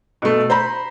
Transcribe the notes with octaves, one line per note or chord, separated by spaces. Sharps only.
B2 A3
C5 A#5 B5